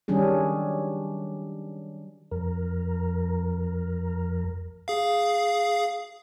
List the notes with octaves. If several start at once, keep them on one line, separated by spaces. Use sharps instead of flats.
D#3 F#3 G3 C#4 D4 G#4
F2 A#4
G#4 F5